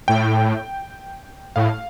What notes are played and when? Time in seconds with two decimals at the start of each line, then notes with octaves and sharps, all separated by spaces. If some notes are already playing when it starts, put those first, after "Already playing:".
0.08 A2 G5
1.56 A2 F5